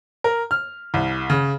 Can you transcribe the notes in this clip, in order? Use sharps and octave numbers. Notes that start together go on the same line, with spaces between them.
A#4
F6
C2
C#3